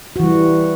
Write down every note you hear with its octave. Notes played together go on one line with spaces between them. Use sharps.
E3 G3 F#4